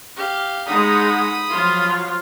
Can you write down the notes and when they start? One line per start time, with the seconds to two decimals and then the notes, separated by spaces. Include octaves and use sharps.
0.17 G4 F5
0.67 G#3 D#4 F#5 B5 D#6
1.50 F3 F#3 F4